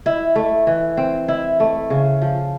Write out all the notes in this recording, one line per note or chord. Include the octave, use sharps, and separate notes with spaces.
E4
A3
E3
C4
E4
A3
C#3
F3